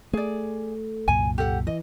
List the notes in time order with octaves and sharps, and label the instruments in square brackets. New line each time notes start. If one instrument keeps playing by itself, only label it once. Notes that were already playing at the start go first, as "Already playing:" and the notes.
[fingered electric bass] A3 [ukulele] G#4 D5
[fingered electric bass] C2 F#2 A#2 [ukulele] G#5
[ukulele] G4 A4 F#5
[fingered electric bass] E3 [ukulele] D#5